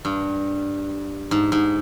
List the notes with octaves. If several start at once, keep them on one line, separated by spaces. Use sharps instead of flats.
G2
G#2
G#2